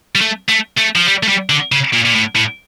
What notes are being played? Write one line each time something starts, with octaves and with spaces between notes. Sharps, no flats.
G3
A3
A3
A3
F3
G3
A3
G3
D3
C#3
A#2
A#2
A2
A2